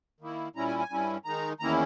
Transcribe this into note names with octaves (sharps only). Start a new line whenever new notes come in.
D#3 A#3 E4
A#2 G3 C#4 E4 A#5
G#5
G#5
G2 G3 C#4 E4
D#3 G#3 D#4 A#5
E2 D#3 A#3 C#4 E4 A#5